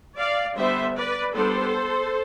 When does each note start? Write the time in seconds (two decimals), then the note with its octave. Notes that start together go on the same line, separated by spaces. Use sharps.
0.17 D5 F5
0.56 D3 G3 B3 C5 E5
0.95 B4 D5
1.35 G3 B3 D4 A4 C5